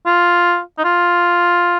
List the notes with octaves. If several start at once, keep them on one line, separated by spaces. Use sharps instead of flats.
F4
D#4
F4